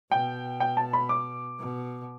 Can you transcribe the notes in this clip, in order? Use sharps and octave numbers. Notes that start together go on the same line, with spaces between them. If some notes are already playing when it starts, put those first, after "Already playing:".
B2 G5
G5
A5
B5
D6
B2